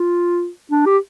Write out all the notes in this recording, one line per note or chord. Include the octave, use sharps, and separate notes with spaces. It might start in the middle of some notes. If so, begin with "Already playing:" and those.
Already playing: F4
D4
G4